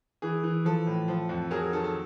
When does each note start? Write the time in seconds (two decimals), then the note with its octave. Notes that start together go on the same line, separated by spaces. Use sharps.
0.22 E3 G#4
0.44 E3
0.65 F3 A4
0.87 A2
1.08 F3
1.29 F2
1.51 F#3 G#4 A#4
1.73 D#3 A4
1.84 A4